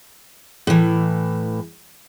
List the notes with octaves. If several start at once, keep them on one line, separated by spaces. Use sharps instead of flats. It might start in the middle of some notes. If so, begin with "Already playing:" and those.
A2 E3